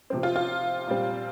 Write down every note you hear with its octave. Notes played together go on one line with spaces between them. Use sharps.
C3 F3 C4
F4
F4
A#2 G3 C4